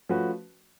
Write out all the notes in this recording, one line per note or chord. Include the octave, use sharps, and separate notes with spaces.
F3 A3 C#4 F#4 B4